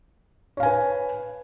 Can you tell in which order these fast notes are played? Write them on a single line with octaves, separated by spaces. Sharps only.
C#5 F5 G#5 B4